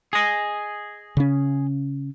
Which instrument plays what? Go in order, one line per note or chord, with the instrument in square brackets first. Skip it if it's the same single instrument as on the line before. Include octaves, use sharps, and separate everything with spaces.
[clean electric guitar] G#4 D#5
[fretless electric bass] C#3 C#4